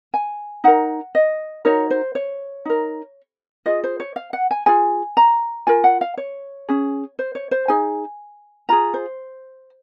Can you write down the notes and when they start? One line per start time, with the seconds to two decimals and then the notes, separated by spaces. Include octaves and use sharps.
0.14 G#5
0.64 D#4 A#4 F#5
1.15 D#5
1.65 D#4 F#4 A#4 C#5
1.91 C5
2.15 C#5
2.65 D#4 A#4
3.66 F4 G#4 D#5
3.84 C5
4.00 C#5
4.16 F5
4.33 F#5
4.51 G#5
4.66 F4 G#4 G#5
5.17 A#5
5.67 F4 A#4 G#5
5.84 F#5
6.01 F5
6.17 C#5
6.69 C#4 G#4
7.19 C5
7.35 C#5
7.51 C5
7.68 D#4 G#4 G#5
8.69 F4 G#4 A#5
8.94 C5